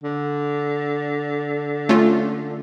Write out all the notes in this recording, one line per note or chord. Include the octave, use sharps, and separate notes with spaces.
D3
A3 C#4 F4